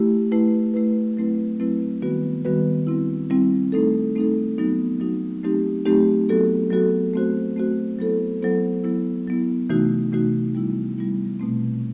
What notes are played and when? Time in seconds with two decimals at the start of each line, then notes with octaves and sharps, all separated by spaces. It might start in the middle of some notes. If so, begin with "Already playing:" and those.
Already playing: A3 E4 G4
0.32 A3 E4 B4
0.74 A3 E4 B4
1.17 F#3 A3 C4 E4 B4
1.60 F#3 A3 C4 E4 B4
2.02 D#3 G3 B3 F#4 B4
2.45 D#3 G3 B3 F#4 B4
2.87 G3 C4 E4
3.30 G3 C4 E4
3.72 A3 C4 D#4 A4
4.15 A3 C4 D#4 A4
4.58 F#3 B3 D#4 F#4
5.00 F#3 B3 D#4 F#4
5.44 F#3 A3 C4 D#4 G4
5.86 F#3 A3 C4 D#4 G4
6.29 F#3 B3 F#4 A4
6.71 F#3 B3 F#4 A4
7.14 A3 C4 F#4 C5
7.57 A3 C4 F#4 C5
7.99 F#3 B3 E4 A4 C5
8.42 F#3 B3 E4 A4 C5
8.84 F#3 B3 E4
9.28 F#3 B3 E4
9.70 C3 E3 A3 D#4 F#4
10.12 C3 E3 A3 D#4 F#4
10.55 G3 B3 E4
10.98 G3 B3 E4
11.40 B2 A3 C4